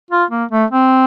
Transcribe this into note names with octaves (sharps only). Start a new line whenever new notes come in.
F4
A#3
A3
C4